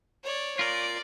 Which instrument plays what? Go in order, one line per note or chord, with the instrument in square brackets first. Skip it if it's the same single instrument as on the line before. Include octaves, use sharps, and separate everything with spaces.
[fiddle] C#5 D5
[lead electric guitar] F4 A#4 [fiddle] D5